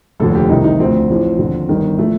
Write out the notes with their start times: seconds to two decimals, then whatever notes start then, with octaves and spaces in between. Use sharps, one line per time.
0.20 F1 D#2 D3 F3 A4
0.35 G4
0.49 C2 C3 D#3 D#4
0.64 D#4
0.79 D2 D3 F3 C4
1.09 A1 A2 F3
1.39 D#2 D3 F3
1.69 G1 G2 D#3
1.98 A#2 F3 A3